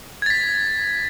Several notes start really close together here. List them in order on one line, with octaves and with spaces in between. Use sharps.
G#6 A6 B6